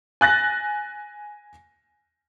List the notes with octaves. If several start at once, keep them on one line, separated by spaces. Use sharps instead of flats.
G#5 F#6 A6 A#6